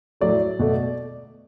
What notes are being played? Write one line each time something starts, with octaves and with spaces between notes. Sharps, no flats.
A2 F#3 A3 D5
B2 A3